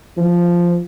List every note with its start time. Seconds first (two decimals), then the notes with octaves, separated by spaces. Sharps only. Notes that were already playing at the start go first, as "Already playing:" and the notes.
0.17 F3